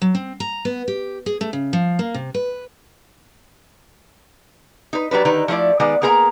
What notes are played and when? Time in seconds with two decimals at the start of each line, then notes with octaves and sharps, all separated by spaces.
0.02 F#3
0.15 C4
0.40 A#5
0.65 B3
0.88 G4
1.26 G#4
1.41 A3
1.53 C#3
1.73 F3
1.99 A#3
2.14 C3
2.34 B4
4.93 D#4 B4
5.11 F#3 G3 D4 B4
5.25 D3 D#3 D#4 B4
5.48 F3 A3 E4 D5
5.80 D#3 G#3 B3 D5
6.02 A#3 B3 G#4 A#4 E5 A#5